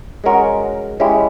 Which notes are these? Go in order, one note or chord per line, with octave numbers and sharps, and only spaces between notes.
G#3 C#4 F#4 A#4
G#3 C#4 E4 G4